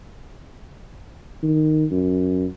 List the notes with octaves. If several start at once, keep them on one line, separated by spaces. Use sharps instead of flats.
D#3
F#2